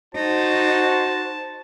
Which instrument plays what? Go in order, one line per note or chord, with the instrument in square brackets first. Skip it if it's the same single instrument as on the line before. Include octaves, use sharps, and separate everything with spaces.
[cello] D#4 [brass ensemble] F#4 [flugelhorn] C5 [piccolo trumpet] A5